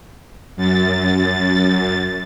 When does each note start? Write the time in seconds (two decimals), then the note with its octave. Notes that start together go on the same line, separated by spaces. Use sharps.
0.56 F#2 A6